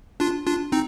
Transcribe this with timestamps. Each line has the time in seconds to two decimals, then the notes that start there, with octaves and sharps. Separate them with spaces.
0.20 D4 F4
0.47 D4 F4
0.72 C4 D#4